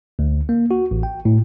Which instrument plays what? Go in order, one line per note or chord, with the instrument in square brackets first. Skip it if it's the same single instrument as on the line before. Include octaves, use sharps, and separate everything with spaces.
[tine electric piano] D2
A#3
F#4
A1
G5
A2